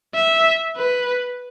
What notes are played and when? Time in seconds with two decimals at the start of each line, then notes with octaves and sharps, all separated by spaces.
0.15 E5
0.77 B4